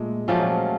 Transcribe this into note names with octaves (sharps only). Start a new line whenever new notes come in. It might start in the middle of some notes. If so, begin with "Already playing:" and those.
Already playing: A#2 G#3 A3
A#2 F3 F#3 A3 C#4